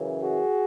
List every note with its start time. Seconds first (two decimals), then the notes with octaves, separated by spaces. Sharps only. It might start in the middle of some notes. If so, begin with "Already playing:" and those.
Already playing: F#2 C#3 E3
0.21 F#4 G#4